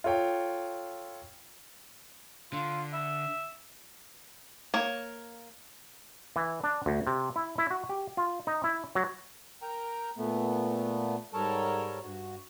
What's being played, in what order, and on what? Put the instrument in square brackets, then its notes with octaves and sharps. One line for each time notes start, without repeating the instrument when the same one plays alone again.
[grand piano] F4 A4 C#5 G5
[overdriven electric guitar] D3 [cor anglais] F4
[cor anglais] E5
[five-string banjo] A#3 C#5
[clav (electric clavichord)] E3
D4
D2
C3
E4
E4
F#4
G4
F4
D#4
E4
F#3
[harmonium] A#4 G5 A#5
A#2 A3 B3
G#2 G3 A4 A#4 C#5 A5
G2 F#4